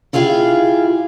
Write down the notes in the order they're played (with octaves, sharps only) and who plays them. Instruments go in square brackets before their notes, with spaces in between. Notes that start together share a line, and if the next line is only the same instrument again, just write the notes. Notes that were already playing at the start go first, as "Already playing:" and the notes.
[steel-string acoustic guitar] E4 F4 G4 G#4 F5